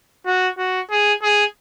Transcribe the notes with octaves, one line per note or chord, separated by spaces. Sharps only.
F#4
F#4
G#4
G#4